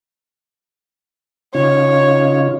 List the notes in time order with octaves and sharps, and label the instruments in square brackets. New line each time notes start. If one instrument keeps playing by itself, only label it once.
[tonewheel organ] C#3 D#4 F4 [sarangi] C#5